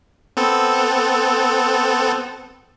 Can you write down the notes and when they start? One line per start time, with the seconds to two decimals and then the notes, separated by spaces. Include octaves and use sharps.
0.37 B3 C4 A4